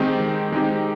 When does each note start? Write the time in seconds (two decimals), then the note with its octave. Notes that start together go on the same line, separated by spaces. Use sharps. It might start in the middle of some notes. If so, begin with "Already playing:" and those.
Already playing: D#3 G#3 C4 D#4 G4
0.20 D#3
0.52 G#3 C4 D#4 G4